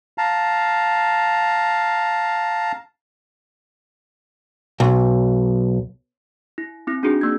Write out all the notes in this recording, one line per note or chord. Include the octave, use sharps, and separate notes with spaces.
F5 A5 A#5
B1
E4
C4 E4
C4 D4 D#4 F#4 G#4
A#3 G#6